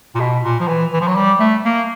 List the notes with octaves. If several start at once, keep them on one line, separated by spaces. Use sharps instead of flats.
A#2
B2
A#2
F3
E3
E3
F3
F#3
G3
A3
A#3